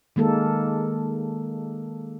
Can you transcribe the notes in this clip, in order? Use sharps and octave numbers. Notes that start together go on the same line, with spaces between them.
D#3 G#3 A#3 A4